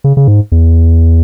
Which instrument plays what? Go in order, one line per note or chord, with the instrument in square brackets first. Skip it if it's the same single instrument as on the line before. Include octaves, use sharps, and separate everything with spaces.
[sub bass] C#3
C#3
G#2
E2